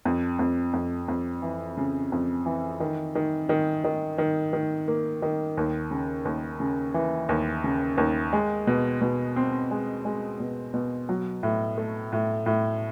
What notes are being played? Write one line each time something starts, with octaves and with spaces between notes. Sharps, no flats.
F2
F2
F2
F2
E3
C#3
F2
E3
D#3
D#3
D#3
D#3
D#3
D#3
A#3
D#3
D#2
C#3
D#2
C#3
E3
D#2
C#3
D#2
G#3
B2
B2
C4
G#3
G#3
B2
B2
F#3
A2
A3
A2
A2